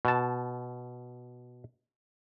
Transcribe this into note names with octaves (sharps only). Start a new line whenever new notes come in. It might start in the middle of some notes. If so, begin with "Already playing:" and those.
B2 A5